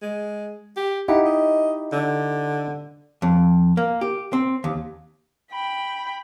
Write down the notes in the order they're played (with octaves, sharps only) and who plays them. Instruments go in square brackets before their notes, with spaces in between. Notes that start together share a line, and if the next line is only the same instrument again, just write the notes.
[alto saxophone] G#3
G4
[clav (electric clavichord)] D#4 E4 G4 [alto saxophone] F#5
[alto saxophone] D#5
D3
[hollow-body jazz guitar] F2
A#3
G4
C4
D#2
[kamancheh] G5 B5